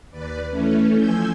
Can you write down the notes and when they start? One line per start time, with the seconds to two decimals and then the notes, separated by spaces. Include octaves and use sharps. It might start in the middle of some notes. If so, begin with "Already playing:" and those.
0.11 D#2 B4 D5
0.50 E3 A3 C#4
0.94 F3 G#5 E6 G6